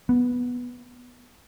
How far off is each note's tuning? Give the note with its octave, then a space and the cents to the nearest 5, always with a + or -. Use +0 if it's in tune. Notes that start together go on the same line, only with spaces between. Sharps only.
B3 -5